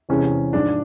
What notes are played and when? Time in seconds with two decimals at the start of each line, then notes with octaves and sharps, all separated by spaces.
0.09 E2 C3 E3 G#3 C#4
0.53 G#2 F3 G#3 D4